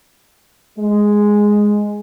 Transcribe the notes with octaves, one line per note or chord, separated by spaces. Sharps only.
G#3